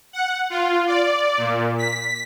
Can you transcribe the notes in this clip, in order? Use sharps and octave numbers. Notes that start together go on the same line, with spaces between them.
F#5
F4
D5
A#2
B6